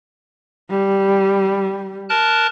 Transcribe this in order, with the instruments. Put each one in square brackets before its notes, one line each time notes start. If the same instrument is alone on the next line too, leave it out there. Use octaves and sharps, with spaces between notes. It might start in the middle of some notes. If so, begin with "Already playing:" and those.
[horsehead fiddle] G3
[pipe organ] A#4 A5 F#6